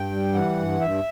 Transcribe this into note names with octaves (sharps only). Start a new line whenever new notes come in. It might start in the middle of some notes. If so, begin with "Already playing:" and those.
Already playing: G2 G5
G3
E3 F#5
G2
G2 E5